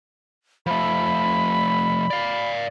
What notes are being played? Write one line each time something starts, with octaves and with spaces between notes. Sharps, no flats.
F3 A3 B5
D5 F5